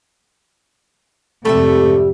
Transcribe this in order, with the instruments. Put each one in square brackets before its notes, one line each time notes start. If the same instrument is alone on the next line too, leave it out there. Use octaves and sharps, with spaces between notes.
[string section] F2 G#2 C3 [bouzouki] G3 G4 E5 [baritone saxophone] A3